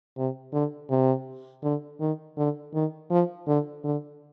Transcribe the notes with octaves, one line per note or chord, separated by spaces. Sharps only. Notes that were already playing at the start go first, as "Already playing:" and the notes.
C3
D3
C3
D3
D#3
D3
D#3
F3
D3
D3